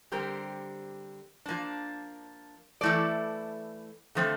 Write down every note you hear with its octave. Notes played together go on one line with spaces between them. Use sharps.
D3 G3 C4 G4 A#4
F3 A#3 D4
E3 A3 E4 A4 D5
D3 F3 A3 C4